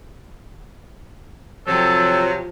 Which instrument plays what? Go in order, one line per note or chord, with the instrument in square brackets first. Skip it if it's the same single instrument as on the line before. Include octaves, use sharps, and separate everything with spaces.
[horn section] C3 F#3 [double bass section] F3 [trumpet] A4